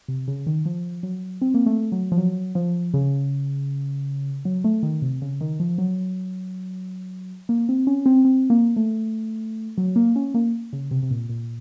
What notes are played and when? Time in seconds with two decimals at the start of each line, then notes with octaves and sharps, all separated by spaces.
0.08 C3
0.28 C#3
0.47 D#3
0.65 F3
1.03 F#3
1.41 C4
1.54 A#3
1.66 A3
1.92 F#3
2.12 F3
2.18 F#3
2.55 F3
2.94 C#3
4.45 F#3
4.64 A3
4.83 D#3
5.02 C3
5.22 C#3
5.41 D#3
5.60 F3
5.78 F#3
7.49 A#3
7.69 C4
7.87 C#4
8.06 C4
8.25 C4
8.50 A#3
8.76 A3
9.78 F#3
9.96 A#3
10.16 C#4
10.34 A#3
10.73 C#3
10.91 C3
11.03 C3
11.11 A#2
11.29 A#2